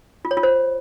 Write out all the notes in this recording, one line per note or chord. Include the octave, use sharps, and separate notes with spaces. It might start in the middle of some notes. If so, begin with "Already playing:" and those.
F4
C#5
F4
C5